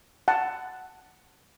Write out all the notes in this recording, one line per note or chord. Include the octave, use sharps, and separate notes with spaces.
F#5 A5